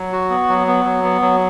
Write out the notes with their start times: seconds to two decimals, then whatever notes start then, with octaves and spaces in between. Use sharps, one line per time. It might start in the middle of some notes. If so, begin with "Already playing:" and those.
Already playing: F#3
0.12 F#4
0.30 B3
0.49 F#3
0.67 B3
0.85 F#3
1.03 B3
1.21 F#3